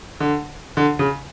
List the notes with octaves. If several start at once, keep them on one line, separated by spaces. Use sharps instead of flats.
D3
D3
C#3